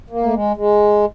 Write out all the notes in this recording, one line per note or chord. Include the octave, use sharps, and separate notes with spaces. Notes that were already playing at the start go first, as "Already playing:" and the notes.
A#3
A3
G#3
G#3